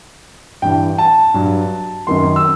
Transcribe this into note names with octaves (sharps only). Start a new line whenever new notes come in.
G2 E3 G5
A5
G2 F#3
F#2 D#3 F#3 C6
E6